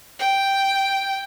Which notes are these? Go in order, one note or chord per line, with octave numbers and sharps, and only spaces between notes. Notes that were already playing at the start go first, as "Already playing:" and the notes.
G5